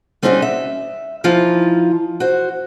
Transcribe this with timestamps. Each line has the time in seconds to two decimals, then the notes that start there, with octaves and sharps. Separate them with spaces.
0.23 G3 C4 C#4 D#4 F4 F#4
0.42 E5
1.24 E3 F3 D#4 F4
2.20 F#4 C5